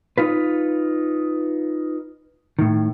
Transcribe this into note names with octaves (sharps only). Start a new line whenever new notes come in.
D#4 F4 B4
A2 D#3